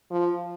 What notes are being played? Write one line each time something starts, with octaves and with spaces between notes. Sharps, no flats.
F3